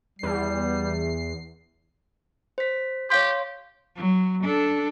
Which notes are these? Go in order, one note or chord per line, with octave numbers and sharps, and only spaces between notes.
E2 G3 C7
C5 B6
G4 C#5 F5 C6
F#3
D4 A4